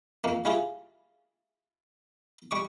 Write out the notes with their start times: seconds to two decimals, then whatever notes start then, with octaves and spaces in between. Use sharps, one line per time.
0.24 F2 A#3
0.45 G3 E4 F4 G#4
2.51 G3 C#6 D6